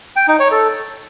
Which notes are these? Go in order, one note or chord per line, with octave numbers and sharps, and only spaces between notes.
G5
D#4
C#5
A4